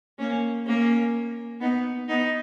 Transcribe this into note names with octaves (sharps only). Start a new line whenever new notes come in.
A#3 C#4
A#3 C#4
B3 D#4
B3 D#4